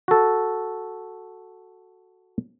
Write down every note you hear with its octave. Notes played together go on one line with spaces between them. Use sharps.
F#4 A4